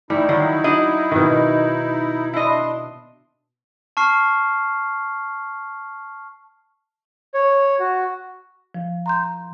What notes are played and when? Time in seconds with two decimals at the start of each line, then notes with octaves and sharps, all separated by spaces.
0.10 G3 A3 D#4 E4
0.29 D#3 F#3
0.64 D4 F#4 D#5
1.12 B2 D#3
2.33 D4 E4 D#5 C6
3.97 A5 C#6 F6 C7
7.34 C#5
7.79 F#4
8.74 F3
9.06 A#5 C6 G6